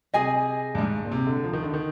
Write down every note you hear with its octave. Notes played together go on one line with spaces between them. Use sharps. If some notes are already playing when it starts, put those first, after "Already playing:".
C3 G#4 D#5 G#5
G2
G#2
A#2
C3
D3
F3
D#3
D3
D#3